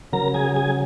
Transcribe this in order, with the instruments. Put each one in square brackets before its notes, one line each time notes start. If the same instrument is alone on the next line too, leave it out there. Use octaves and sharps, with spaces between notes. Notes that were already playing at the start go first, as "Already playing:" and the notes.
[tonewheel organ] C#3 F#3 A#4 A#5
G#4 G#5
G#4 G#5